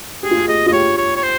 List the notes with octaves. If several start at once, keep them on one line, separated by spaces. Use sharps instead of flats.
G4 G#4
F4
G4
G#4 D#5
F4 D#5
G4 C#5
C#5
C#5
C5